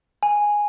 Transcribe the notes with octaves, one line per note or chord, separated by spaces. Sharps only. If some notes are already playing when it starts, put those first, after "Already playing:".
G#5